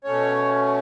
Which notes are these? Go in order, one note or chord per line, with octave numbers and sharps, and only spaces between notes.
B2 A3 C#4 C#5